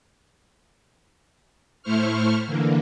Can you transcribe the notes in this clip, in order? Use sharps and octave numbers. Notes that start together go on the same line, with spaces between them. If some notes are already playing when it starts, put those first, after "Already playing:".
A2 A3 E4 C5 C#6 F6
D3 E3 A#3